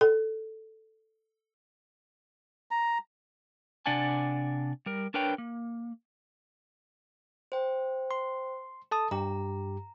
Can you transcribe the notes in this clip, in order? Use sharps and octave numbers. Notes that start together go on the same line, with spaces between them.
A4
A#5
C3 D4 D5 F#5 G#5 A5
G3 A#4
D4 A#4 B4 C#5 G5
A#3
C5 G5
C6
A4 A5 D#6
G2 G4 A#5